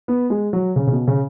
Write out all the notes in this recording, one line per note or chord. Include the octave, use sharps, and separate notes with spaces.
B3
G#3
F#3
C#3
C#3
B2
C#3